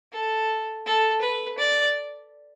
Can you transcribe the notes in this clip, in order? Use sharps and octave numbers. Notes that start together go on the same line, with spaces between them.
A4
A4
B4
D5